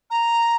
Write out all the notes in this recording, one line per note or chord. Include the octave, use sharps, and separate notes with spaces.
A#5